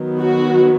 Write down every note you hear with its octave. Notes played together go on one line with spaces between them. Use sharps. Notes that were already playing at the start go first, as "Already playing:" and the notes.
Already playing: D#3 F#3 B3
F#4